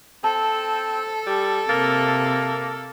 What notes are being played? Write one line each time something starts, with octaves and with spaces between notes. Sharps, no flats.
C4 A4 A5
G3
C3 A#3 A6